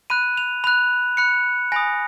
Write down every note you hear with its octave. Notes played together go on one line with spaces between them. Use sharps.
B5 F#6 D#7
F7
B5 F#6 F7
B5 F#6 C#7
G#5 B5 D#6 A#6